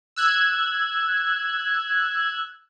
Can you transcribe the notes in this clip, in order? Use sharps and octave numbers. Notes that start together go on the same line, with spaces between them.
E6 F#6 G#6